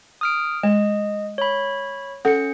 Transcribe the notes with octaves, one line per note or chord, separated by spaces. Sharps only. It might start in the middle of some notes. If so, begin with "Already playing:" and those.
D#6 F6 D7
G#3 D#5
C#5 B5
C#4 A4 F#5 C#7